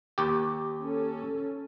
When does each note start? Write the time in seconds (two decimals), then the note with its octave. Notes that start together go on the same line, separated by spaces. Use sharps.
0.18 D#2 G4
0.83 C#4 A4